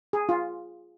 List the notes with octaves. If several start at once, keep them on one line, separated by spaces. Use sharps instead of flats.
G#4
F4